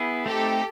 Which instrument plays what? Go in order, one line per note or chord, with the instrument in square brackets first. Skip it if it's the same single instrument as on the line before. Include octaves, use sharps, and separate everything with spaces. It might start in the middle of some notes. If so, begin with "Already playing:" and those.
Already playing: [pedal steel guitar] B3 E4 G#4
[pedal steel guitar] A3 C4 D#4 [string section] G4 A4